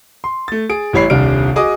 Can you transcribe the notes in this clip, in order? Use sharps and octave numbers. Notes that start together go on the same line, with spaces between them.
C6
A3 A6
G#4 D7
A1 G3 E4 C#5 B5 C7
D#1 C2 G3 D4 F6 D7
F#4 G#4 D#5 D6 D#6